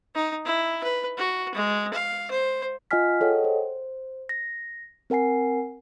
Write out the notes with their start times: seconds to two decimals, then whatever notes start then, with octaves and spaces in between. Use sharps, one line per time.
0.15 D#4
0.45 E4
0.84 B4
1.18 F#4
1.54 G#3
1.93 F5
2.31 C5
2.91 F4 D#5 F#5 G#5 F6 B6
3.20 G#4 A4 C#5 D#5 F#5 G5
3.44 C5
4.29 A#6
5.10 C4 A#4 F#5 G#5 C7